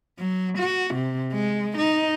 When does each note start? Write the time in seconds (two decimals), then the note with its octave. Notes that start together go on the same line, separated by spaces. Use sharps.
0.19 F#3
0.58 F#4
0.94 C3
1.33 G#3
1.78 D#4